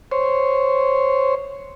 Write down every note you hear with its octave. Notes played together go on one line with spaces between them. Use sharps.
C5 C#5